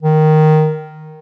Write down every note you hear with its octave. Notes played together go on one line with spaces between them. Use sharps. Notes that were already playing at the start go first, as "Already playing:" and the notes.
D#3